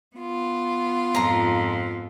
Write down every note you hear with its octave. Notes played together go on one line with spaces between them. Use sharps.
B3 F4
F2 G#2 A#5 C6